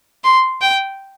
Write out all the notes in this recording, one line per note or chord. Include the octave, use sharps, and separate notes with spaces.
C6
G5